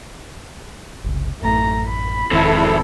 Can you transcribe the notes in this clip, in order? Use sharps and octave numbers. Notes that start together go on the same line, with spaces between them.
F#1 C2 C#3
A1 F#2 A3 A#5
B5
E1 E2 G#2 D#3 F3 C4 E4 A4